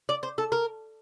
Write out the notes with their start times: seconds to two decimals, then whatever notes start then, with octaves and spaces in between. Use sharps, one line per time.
0.09 D5
0.23 C5
0.38 A4
0.52 A#4